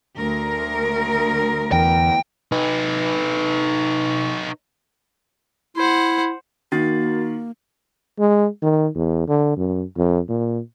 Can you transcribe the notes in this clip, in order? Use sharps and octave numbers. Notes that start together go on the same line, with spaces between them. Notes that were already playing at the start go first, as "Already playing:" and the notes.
D2 A#4
E2 G5
D#4 B4
E4 C5 F#5
D#3 A#3 F#4 A6
G#3
D#3
E2
D3
F#2
F2
A#2